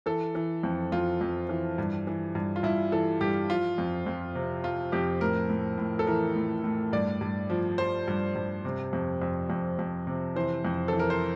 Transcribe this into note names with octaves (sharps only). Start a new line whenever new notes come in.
E3 A4
E3
F2
F2 F4
F2
E3
G2
E3
G2
F4
G2 E4
E3 A4
G2 G4
F3 F4
F2
F2
C3
F3 F4
F2 G4
A2 A#4
A2
A2
A4
E3 A#4
A2
A2
G2 D5
G2
F3
F3 C5
G2
G2
C3
F2
F2
F2
F2
C3
E3 C5
F2
E3 A4
A#4
C5